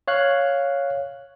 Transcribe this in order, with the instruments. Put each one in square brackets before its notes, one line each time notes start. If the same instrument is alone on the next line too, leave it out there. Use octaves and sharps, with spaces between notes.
[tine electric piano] C#5 F5 F#6